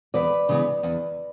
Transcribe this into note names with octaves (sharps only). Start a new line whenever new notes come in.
E2 B4 D5
C#3 E3 B3
E2